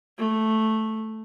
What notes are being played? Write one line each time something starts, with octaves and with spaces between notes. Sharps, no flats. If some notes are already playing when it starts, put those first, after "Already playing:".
A3